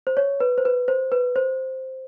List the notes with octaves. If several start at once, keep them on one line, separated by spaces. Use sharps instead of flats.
C5
C#5
B4
C5
B4
C5
B4
C5